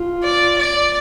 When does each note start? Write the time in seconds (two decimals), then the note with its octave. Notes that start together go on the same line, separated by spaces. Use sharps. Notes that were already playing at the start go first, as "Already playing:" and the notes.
Already playing: F4
0.23 D5
0.58 D5